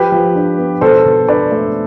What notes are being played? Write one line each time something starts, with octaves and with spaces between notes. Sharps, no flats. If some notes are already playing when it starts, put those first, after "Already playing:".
Already playing: F3 G4 B4
F3
D4
B3
B2 A4 C5
B2
D4 B4 D5
A3